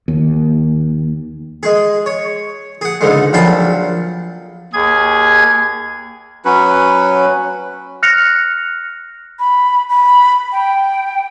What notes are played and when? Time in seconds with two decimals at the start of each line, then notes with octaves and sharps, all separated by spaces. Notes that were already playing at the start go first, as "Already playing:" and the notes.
0.08 D#2
1.63 G#3 G#4
2.06 C#5
2.81 G#4 F#5
3.01 C#2 G#2 D3 G#3
3.33 A#1 A#2 F#3 G5 A5 B5
4.73 D#2 G#4 G#6
6.45 F#3 C#4 B4
8.03 F6 F#6 A#6 C#7 F7
9.39 B5
9.90 B5
10.52 G5